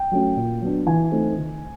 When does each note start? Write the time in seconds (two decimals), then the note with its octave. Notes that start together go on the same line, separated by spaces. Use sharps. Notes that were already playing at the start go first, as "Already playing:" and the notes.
Already playing: G5
0.11 F#3 A3 C#4
0.37 A#2
0.62 F#3 B3 D4
0.86 E3 G#5
1.12 A3 C4 D#4
1.37 D#3